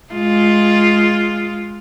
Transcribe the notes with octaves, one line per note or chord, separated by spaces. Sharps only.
G#3 F4